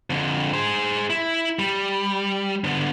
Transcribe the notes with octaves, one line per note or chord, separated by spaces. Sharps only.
F2 D3
G#4 C5
E4
G3
D3 B3